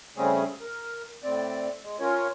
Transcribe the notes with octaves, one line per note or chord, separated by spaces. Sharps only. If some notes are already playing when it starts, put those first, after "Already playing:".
C#3 G3 A3 C4 C#4 G#4
A#4
A2 C4 D5
G#3
C#4 F4 A#4 C#5